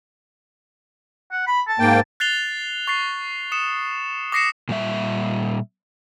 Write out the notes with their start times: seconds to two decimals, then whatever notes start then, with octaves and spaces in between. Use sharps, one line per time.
1.32 F#5
1.47 B5
1.68 A5
1.80 G#2 A#3 G5
2.20 F#6 A6 C7 F7 G7
2.87 C#6 A6 C7
3.52 D#6 C#7 E7
4.32 D6 D#6 A#6 C7 C#7 E7
4.69 A#2 G3 E5